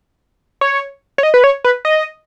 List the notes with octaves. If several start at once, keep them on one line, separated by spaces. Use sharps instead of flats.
C#5
C#5
D#5
B4
C#5
B4
D#5